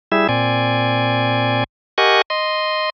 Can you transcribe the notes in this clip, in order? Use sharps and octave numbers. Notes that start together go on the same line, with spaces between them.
G3 E4 G#4 E5
A#2 C4 D5 G#5
G4 A#4 D#5 F#5 G#5 C#6
D#5 C6